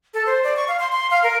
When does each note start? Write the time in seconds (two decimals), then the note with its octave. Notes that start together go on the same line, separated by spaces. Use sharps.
0.14 A4
0.26 C5
0.44 D5
0.57 C#6
0.68 F5
0.79 C6
0.92 C6
1.11 F5
1.23 A#4